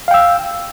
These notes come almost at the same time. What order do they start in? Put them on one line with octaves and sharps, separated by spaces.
F5 G5 E6